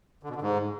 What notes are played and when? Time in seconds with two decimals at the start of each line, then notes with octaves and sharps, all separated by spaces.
0.23 D3
0.29 B2
0.35 D3
0.42 G#2